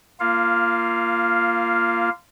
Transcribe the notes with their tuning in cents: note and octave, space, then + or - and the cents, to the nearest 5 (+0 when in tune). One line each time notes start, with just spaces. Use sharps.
A#3 +0 F4 -20 F5 +0